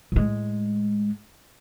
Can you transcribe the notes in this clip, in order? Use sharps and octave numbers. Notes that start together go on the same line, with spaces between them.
A2 G#3